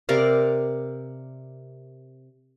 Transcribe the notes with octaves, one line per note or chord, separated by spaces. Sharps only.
C3 A#4 D5 F5